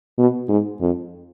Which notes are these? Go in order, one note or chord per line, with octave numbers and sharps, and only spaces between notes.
B2
G#2
F2